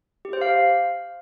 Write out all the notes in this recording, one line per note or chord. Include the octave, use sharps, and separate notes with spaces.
G4
C5
F5